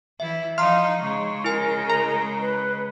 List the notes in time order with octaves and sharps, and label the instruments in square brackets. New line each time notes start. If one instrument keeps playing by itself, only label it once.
[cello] E3 E4 [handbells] E5
[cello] F3 D#4 [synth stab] F5 [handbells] A#5 C6
[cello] C#3 G#3 [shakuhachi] C#6
[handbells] E4 G#5 [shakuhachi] A#4
[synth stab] A#5
[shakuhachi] B4